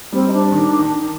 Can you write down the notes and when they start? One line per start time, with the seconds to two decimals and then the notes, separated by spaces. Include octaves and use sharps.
0.13 G3 C4
0.28 D#4
0.33 D4
0.52 D#3
0.79 D#3